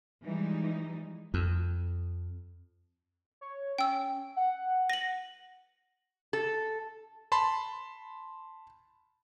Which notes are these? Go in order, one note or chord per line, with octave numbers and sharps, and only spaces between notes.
E3 F3 G3 G#3 D#4
F2
C#5
C#4 G5 E6
F#5
A#6 F#7
A4
A5 B5 C6